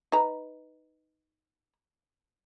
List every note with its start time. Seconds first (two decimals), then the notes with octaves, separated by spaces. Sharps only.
0.12 D#4 B4 A#5